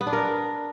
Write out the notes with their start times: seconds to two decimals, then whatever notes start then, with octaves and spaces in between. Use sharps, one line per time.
0.01 B3
0.07 D4
0.13 A#4